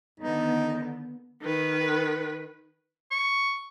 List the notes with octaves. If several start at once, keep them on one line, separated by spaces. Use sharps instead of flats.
D3 D#3 B3 D#4
D#3 B4
C#6